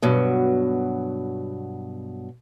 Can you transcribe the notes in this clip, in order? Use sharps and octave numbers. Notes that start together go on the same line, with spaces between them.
G2 B2 F#3